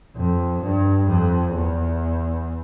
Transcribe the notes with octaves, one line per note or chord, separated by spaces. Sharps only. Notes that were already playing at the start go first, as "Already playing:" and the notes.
F2
G2
F2
E2